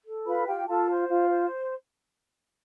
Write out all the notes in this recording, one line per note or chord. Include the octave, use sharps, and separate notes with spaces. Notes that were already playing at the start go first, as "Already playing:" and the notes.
A4
F4 B4 B5
F4 G4 G5
F4 A4 A5
C5
F4
C5